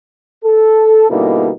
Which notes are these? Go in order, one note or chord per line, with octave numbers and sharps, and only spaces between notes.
A4
B2 D3 G3 A#3 D#4 E4